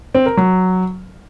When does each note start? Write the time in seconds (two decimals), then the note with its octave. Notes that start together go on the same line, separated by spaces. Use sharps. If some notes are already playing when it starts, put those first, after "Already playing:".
0.15 C4
0.26 A#4
0.37 F#3